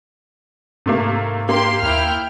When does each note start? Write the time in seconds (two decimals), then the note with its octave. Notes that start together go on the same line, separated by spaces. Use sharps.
0.86 G#2 C3 A3 A#3
1.49 A#3 G4 C6
1.82 D#2 E4 G5 F6